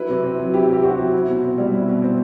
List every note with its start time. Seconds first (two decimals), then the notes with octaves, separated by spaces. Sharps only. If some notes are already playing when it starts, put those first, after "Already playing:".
Already playing: F#3 E4 B4
0.09 C3
0.24 C4
0.39 F#3
0.54 E4 G4
0.69 C3 G4
0.83 C4 F#4
0.98 F#3
1.13 E4
1.28 B2
1.43 C4
1.58 G3
1.73 E4
1.88 B2
2.02 C4